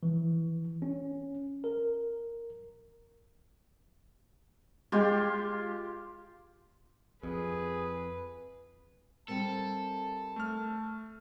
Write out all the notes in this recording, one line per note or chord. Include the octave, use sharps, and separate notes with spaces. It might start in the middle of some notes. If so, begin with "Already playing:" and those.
E3
C#4
A#4
G#3 F4 G4
F2 G#4 B4
G3 C4 A4 A#4 A5
A3 F6